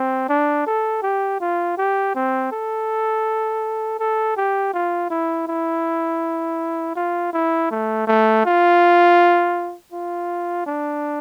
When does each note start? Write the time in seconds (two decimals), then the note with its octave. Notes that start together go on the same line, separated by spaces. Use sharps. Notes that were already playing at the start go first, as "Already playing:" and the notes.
Already playing: C4
0.29 D4
0.67 A4
1.03 G4
1.41 F4
1.78 G4
2.15 C4
2.52 A4
4.00 A4
4.37 G4
4.74 F4
5.10 E4
5.47 E4
6.96 F4
7.33 E4
7.71 A3
8.07 A3
8.45 F4
9.93 F4
10.67 D4